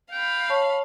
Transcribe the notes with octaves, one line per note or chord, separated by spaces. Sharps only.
F5 G5 B5
C#5 A5 C#6